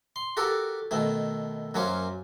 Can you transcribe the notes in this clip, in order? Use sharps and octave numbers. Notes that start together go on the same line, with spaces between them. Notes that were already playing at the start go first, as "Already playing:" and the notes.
C6
F#4 G4 A4 A#4
B2 D#3 A3
F#2 F#3 A#3 C#4 C5